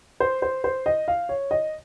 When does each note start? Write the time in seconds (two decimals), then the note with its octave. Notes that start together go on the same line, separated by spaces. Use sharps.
0.20 C5
0.42 C5
0.64 C5
0.86 D#5
1.08 F5
1.29 C#5
1.51 D#5